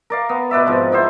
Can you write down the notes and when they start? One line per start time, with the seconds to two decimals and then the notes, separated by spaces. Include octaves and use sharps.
0.10 A#4 D5 F5
0.29 B3
0.51 B2 B4 D5 E5
0.66 G#2 F3 C4
0.92 B3 E4 C5